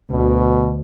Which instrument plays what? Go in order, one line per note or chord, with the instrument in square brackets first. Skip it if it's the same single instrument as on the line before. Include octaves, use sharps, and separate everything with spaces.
[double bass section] D2 [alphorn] B2